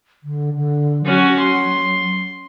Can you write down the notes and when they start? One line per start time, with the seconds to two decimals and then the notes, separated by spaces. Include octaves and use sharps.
0.23 D3
0.55 D3
1.05 F#3 C#4 F#4
1.39 C6